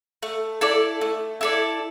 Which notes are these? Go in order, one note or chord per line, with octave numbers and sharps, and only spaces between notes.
A3
E4 A4 D5
A3
E4 A4 D5